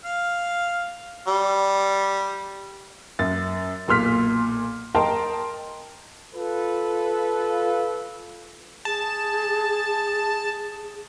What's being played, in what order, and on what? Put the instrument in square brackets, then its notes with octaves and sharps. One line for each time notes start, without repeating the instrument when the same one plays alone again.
[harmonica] F5
G3
[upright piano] F#2 A6
B1 A#2 C6 F6 B6
A#4 D#5 G5 A5 A#5 C6
[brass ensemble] F4 A4 B4
[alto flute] G#4 [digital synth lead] A5